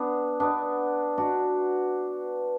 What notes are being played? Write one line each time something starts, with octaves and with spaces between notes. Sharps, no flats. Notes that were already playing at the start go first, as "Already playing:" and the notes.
Already playing: B3 D4
B3 D4
D4 F#4